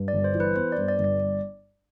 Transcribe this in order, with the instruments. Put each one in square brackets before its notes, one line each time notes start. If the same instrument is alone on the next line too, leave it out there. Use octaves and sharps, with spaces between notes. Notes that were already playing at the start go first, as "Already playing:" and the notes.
Already playing: [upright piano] G2
[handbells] D5
[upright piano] G1
[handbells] C5
[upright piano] E3
[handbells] B4
[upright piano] B3 [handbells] C5
[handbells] D5
[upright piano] G2
[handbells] D5
[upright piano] G1
[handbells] D5